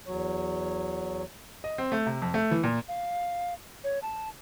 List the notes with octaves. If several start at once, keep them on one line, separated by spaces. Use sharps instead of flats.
E2 F#3 C#5
D#5
C4
A3
C3
F2
A3
E3
A#2
F5
C#5
A5